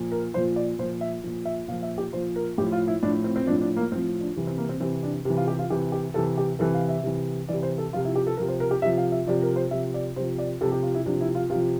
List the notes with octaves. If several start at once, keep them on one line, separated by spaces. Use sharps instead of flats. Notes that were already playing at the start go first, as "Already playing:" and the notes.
Already playing: A#2 F3
A#4
A#2 F3 C5
D5
A#2 F3 C5
E5
A#2 F3
E5
A#2 F3 F5
E5
G4
A#2 F3 C5
A#4
A2 F3 G4
F4
E4
A2 F3 D4
C4
C4
F3 D4
A2
D4
A#3
A2 F3 C4
D4
C3 E3
C4
A#3
C4
C3 E3 C4
D4
C3 E3
F4
G4
F4
C3 E3 G4
G4
C3 E3 A4
G4
C3 E3 A4
F5
E5
C3 E3
C3 E3 D5
C5
A4
C3 F3 F4
E4
G4
A4
C3 F3 A#4
C5
A#4
G4
C3 F3 E5
F5
E5
C3 F3 D5
A#4
C5
C3 F3 E5
D5
C3 F3 C5
D5
C3 F3 A4
G4
F4
E4
C3 F3 D4
E4
F4
C3 F4
F3